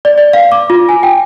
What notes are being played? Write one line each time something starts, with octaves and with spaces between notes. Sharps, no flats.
D5
D5
F5
D6
F4
G#5
G5